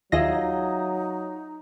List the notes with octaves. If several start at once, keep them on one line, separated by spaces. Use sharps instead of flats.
D#2 F#3 D#4 F4 G#4 D#5 E5 A#6